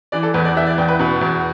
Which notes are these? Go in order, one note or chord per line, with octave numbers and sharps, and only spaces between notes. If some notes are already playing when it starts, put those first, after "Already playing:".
E3 D5
A4
E2 B4
D5
E3 E5
D5
E2 G5
B4
B2 B4
E2